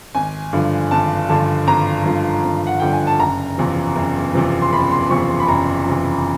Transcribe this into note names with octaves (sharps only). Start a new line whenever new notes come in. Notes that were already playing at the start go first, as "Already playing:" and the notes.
G#1 G#5
G2 D3 F3
G#1 A5
G2 D3 F3 A5
G#1 A#5
G2 D3 F3
G#1
F#5
G2 D3 F3 G5
G#5
A5
F#1 A#5
E2 C3 F3
F#1
E2 C3 F3
C6
F#1 B5
C6
E2 C3 F3 C#6
C6
B5
F#1 A#5
E2 C3 F3